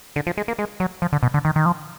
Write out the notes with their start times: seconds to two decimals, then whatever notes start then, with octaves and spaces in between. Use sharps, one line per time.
0.16 D3
0.27 F3
0.37 G#3
0.48 A#3
0.59 G#3
0.80 F#3
1.02 F3
1.13 D3
1.23 B2
1.34 D3
1.45 D#3
1.56 D#3
1.66 F3